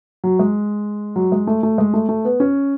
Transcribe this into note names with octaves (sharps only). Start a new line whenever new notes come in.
F#3
G#3
F#3
G#3
A3
A3
G#3
A3
A3
B3
C#4